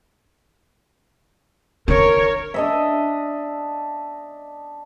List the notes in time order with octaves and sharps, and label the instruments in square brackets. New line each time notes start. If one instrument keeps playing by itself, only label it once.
[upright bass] D#3 D4 [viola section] A#4 C#5
[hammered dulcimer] D4 D#5 E5